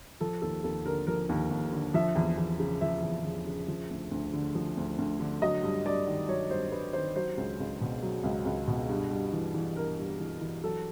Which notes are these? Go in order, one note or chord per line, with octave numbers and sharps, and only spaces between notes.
F3 A4
D#2 A4
D#2 A4
D3 A#4
F3 A#4
D#2
D#2
D3
F3 E5
E2
E2
C#3
F3 E5
E2
E2
C#3
F3
D2
D2
D3
F3
D2
D2
D3
F#3 D#5
G2
G2 D5
D#3
F#3 C#5
G2 C5
G2 B4
D#3 C5
F#3 C5
C#2
C#2
B2
F#3
C#2
C#2
B2
G2
G2
E3
E3
G2 A#4
G2
E3
E3
F#3 A4